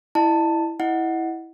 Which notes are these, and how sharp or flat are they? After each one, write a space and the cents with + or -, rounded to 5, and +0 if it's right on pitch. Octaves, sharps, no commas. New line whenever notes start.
E4 +0 D#5 -45 A5 +15
E4 -10 D#5 +0 F#5 +0